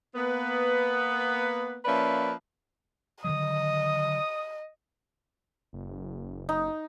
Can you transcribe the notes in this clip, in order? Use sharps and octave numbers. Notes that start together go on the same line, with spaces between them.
A#3 B3 B4
F3 A#3 C#4 B4 D5 E5
D3 D#3 F#3 D#5 D#6
F#1
D#4